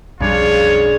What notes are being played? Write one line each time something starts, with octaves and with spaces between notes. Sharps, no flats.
B1 F2 C#3 G3 D4 F4 C#5